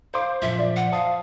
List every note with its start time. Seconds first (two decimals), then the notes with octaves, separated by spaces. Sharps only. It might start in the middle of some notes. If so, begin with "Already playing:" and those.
0.14 C5 F5 D6
0.42 A#1 F#2 F3 E5
0.59 D5
0.76 F#5
0.92 C5 F5 A5 D#6